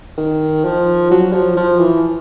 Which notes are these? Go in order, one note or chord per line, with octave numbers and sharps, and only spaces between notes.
D#3
F3
F#3
F3
F3
E3